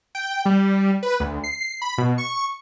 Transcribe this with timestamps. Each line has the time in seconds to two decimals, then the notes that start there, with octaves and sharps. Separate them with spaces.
0.15 G5
0.46 G3
1.03 B4
1.20 D2
1.44 C7
1.82 B5
1.98 B2
2.18 C#6